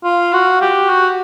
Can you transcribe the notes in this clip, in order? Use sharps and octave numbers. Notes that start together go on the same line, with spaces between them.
F4
F#4
G4
F#4